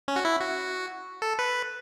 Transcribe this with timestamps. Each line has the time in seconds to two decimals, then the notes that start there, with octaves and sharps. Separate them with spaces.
0.08 C#4
0.16 F#4
0.25 E4
0.40 F#4
1.22 A4
1.39 B4